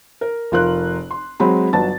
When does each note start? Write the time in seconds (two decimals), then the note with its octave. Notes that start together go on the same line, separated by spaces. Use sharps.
0.21 A#4
0.52 F1 F4 A#4 F#6
1.11 C6
1.40 F#3 G#3 C4 B5
1.73 G1 F#3 B4 A5 A6